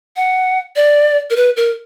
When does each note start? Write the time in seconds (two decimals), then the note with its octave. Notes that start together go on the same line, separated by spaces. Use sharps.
0.16 F#5
0.76 D5
1.30 A#4
1.36 B4
1.57 A#4